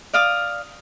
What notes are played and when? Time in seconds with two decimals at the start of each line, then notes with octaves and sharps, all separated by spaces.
0.14 D5 F5 D#6